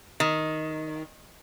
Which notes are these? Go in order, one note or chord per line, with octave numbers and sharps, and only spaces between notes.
D#3